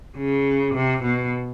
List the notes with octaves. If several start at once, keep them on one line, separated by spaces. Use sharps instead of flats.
C#3
C3
B2